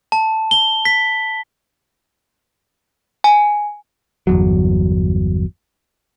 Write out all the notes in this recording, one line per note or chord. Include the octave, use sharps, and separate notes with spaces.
A5
G7
B6
G#5
G1 E2 F#3